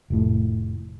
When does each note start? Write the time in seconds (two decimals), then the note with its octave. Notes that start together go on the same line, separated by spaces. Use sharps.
0.10 F1 A2